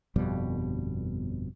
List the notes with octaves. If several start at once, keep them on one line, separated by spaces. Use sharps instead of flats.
G1 F2 B2 G3